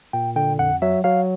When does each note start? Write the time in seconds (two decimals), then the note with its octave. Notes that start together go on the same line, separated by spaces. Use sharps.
0.13 A#2 G5
0.36 D3 G5
0.59 F2 F#5
0.82 F#3 E5
1.04 F#3 F5